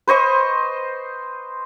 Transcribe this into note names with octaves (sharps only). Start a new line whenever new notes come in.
B4 C5 D#5 C#6